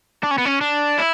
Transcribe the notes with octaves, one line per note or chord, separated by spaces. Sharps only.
D4
C#4
B3
C#4
D4
E4